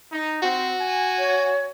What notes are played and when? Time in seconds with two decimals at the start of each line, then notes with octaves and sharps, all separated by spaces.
0.11 D#4
0.42 C4 F#4
0.79 G#5
1.19 C#5